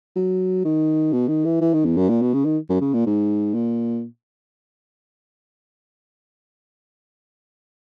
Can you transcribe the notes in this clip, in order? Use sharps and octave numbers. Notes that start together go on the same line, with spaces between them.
F#3
D#3
B2
D#3
E3
E3
D#3
E2
F#2
A#2
B2
C#3
D#3
F#2
C#3
A#2
G#2
A#2